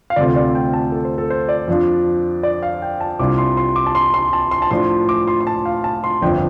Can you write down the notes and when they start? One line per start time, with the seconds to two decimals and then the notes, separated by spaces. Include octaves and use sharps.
0.10 F5
0.16 D2 C3 A3 C4 F4 D5
0.36 D5
0.55 G5
0.73 A5
0.92 A4
1.05 C5
1.18 A4
1.30 C5
1.49 D5
1.68 F2 F3 D4 F4
2.43 D5
2.63 F5
2.82 G5
3.01 A5
3.19 C2 C3 G3 D4 F4 D6
3.38 C6
3.57 C6
3.76 D6
3.86 A5
3.95 C6
4.14 C6
4.33 A5
4.51 C6
4.62 A5
4.71 A2 F3 D4 C6
5.09 D6
5.28 C6
5.40 C6
5.47 A5
5.66 F5
5.84 A5
6.04 C6
6.22 G1 F2 F3 D4 G5